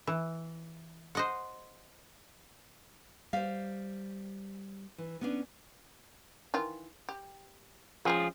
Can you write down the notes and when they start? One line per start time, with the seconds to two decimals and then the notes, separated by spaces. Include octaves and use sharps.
0.07 E3
1.15 C5 D#5 F#5
3.33 G3 C5 F5
4.98 E3
5.21 B3 C#4 D4
6.54 D#3 E3 F4
7.09 G4
8.05 F3 G#3 C4 C#4 F4 G#4